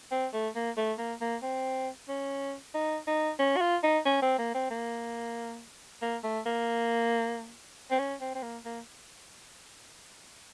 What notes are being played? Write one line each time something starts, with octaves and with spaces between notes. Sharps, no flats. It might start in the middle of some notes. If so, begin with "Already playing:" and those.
C4
A3
A#3
A3
A#3
A#3
C4
C#4
D#4
D#4
C#4
F#4
F4
D#4
C#4
C4
A#3
C4
A#3
A#3
A3
A#3
C4
C#4
C4
C4
A#3
A#3